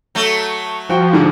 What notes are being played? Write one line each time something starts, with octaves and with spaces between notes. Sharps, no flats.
F#3 A3
F3 F#4 G5
G#2 D3